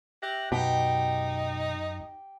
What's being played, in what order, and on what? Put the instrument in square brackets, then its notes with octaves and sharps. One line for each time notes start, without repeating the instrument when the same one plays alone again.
[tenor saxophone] G4 [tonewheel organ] E5 F#6 A#6
[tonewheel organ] F#2 [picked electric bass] B2 [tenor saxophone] D#4 [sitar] G4